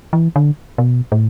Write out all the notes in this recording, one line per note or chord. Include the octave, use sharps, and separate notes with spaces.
E3
D3
B2
A2